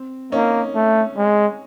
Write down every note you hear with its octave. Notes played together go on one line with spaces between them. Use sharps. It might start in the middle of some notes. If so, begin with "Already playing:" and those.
Already playing: C4
A#3 C#4 D#4
A3
G#3